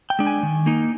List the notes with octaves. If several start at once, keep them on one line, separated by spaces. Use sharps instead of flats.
G5
G#3 D4
G#5
D#3
A#3 D#4